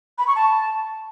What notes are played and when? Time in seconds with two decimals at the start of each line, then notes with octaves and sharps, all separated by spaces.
0.18 B5
0.27 C#6
0.36 A5